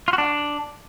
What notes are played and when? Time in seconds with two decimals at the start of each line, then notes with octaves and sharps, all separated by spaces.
0.08 F4
0.13 F#4
0.18 D4